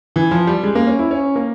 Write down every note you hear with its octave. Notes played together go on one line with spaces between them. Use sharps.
E3
F3
G3
G#3
A#3
C#4
E4
C#4
A#3